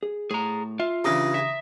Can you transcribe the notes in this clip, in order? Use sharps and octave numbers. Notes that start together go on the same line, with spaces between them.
G#4
A2 G#4 A#5
F4 E5
C#3 E3 D4 G4 A#5 D#6 A#6
E5